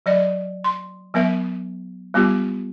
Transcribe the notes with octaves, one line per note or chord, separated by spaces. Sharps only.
F#3 D5 D#5
C6
F#3 B3 A#4 E5
G3 B3 F4 G4